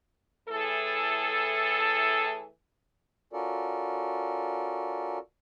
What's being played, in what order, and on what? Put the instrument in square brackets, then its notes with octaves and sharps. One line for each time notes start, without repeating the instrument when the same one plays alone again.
[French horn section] A2 E3 G#4 A4
[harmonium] C#4 F4 F#4 A4 A#4 D5